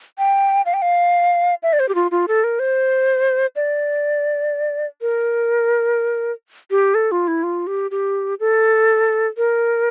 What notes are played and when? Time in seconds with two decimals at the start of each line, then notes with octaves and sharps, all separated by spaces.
0.18 G5
0.66 F5
0.74 G5
0.82 F5
1.63 E5
1.73 D5
1.80 C5
1.89 G4
1.95 F4
2.11 F4
2.28 A4
2.44 A#4
2.59 C5
3.56 D5
5.01 A#4
6.71 G4
6.95 A4
7.12 F4
7.28 E4
7.43 F4
7.67 G4
7.91 G4
8.40 A4
9.37 A#4